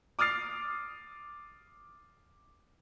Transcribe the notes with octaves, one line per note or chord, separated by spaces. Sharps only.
D6 D#6 F6 A6 C7